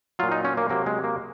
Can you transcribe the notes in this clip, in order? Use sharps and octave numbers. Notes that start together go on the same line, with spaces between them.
A#2 F#3 F4
D#4
C#4
A#3
C3 F#3 A#3
G#3
A#3